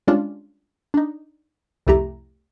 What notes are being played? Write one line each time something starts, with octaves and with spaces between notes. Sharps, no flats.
G3 G#3 C#4 D4 F4
D4 D#4
C2 F2 A3 E4 G4 A#5